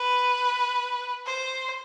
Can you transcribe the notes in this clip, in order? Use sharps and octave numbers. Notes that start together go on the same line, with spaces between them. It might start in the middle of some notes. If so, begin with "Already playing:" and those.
Already playing: B4
C5